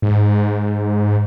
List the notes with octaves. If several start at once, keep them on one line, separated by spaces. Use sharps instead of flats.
G#2